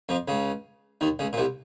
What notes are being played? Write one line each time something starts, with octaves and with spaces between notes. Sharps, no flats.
F2 F3
C#2 C#3
D#2 D#3
C#2 C#3
A#2
C2 C3